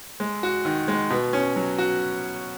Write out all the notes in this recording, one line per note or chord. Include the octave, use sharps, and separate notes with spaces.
G#3
F#4
D#3
G#3
B2
C#4
F#3
F#4